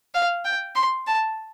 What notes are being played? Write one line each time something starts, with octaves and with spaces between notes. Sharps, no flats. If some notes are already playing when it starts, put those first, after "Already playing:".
F5
G5
C6
A5